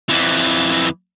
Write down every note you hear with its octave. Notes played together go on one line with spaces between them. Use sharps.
F2 E3